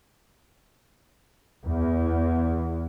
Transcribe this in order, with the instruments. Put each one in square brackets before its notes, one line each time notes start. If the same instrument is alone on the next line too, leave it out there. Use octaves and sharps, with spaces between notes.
[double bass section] E2